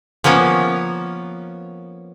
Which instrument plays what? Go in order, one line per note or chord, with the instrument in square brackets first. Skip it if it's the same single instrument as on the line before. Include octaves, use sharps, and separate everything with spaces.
[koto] F3 A#3 B3 C#4